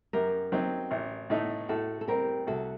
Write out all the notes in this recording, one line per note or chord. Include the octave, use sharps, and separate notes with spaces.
F#2 G4 A#4
F#3 C4 D#4
A1
A2 A3 D#4
A2 F#4 A4
A4
G3 C4 G4 A#4
C2 F#4 A4